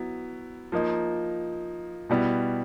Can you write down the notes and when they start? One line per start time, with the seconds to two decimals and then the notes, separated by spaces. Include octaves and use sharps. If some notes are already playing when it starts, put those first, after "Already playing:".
Already playing: F#3 B3 E4
0.72 F3 A#3 D#4
2.10 B2 G3 B3 E4